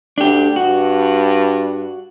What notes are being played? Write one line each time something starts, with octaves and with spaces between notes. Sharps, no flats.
D2 D4 G4
G2 F#4